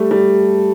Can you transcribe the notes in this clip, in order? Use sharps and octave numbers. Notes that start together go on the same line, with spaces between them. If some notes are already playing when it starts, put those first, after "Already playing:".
Already playing: G3 A3
G3